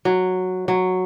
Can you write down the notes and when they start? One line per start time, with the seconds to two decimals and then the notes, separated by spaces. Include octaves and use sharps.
0.05 F#3
0.68 F#3